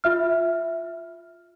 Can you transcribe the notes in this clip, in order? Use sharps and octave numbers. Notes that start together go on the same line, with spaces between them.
F4 E5 F6